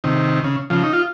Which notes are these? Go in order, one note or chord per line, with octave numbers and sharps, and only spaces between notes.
C3 D#3
C#3
C#3 F3
D#4
F4